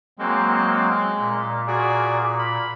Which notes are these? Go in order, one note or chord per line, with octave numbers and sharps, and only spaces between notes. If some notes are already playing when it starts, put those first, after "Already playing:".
F#3 G#3 A#3 C4
A#2
F#4 G#4 D5
B5